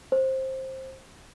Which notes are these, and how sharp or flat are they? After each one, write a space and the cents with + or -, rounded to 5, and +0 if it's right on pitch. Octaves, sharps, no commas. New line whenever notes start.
C5 +15